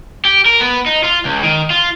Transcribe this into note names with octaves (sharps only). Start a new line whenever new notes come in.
G4
A#4
B3
D#4
F4
C#2
D#3
F4